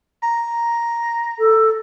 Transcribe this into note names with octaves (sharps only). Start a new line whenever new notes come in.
A#5
A4